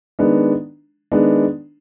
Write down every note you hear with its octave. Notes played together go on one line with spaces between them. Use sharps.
D#3 G#3 B3 D4
D#3 G#3 B3 D4